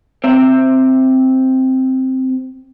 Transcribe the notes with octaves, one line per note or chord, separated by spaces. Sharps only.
C4 E5